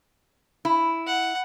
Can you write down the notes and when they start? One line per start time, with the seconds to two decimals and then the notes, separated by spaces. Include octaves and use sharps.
0.65 E4
1.07 F#5